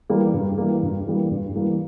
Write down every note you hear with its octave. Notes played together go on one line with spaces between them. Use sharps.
E3 G3 A#3
G2
E3 G3 A#3
G2
E3 G3 A#3
G2
E3 G3 A#3